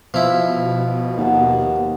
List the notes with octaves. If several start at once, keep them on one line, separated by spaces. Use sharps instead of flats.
B2 F3 E4
D#2 F#5 A5